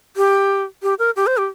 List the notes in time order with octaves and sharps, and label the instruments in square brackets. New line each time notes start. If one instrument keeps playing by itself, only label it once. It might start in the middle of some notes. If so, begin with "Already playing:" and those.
[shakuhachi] G4
G4
A#4
G4
C5
G4